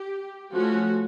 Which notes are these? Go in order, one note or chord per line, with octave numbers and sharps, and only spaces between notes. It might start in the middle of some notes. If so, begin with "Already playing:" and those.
Already playing: G4
F3 A3 C#4 F#4